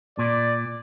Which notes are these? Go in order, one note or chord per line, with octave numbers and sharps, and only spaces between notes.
A#2 D5